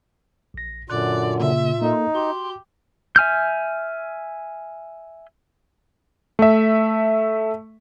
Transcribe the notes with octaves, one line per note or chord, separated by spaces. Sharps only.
A#1 A#6
F#2 A#2 D3 F4 D5 F#6
C#3 A#3 E5
A#3 D#4 A4 D#5
F#4 G4 C6
E5 G#5 F6 G6
A3 E5